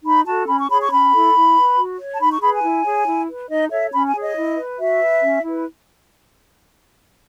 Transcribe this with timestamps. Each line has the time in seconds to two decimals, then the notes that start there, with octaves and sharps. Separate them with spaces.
0.04 D#4 B5
0.26 F#4 A4 A5
0.48 C#4 B5
0.59 C#6
0.69 G#4 C#5 B5
0.81 C#6
0.91 C#4 B5
1.12 E4 A4
1.34 E4
1.56 B4
1.77 F#4
1.99 C#5
2.13 A5
2.20 D#4 B5
2.30 C#6
2.41 G#4 B5
2.44 B4
2.53 G#5
2.63 E4
2.84 G#4 C#5
3.06 E4
3.28 B4
3.49 D#4 D#5
3.71 A4 C#5 E5
3.93 C#4 B5
4.06 G#5
4.14 G#4 C#5
4.22 D#5
4.35 E4
4.57 B4
4.79 F#4 E5
5.00 B4
5.22 C#4
5.43 E4 B4